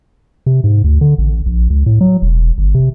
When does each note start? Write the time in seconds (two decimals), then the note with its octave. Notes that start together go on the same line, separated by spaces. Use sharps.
0.46 C3
0.64 G#2
0.84 D2
1.01 D3
1.18 A1
1.46 A#1
1.70 C#2
1.86 A2
2.01 F#3
2.22 E1
2.58 G1
2.75 C3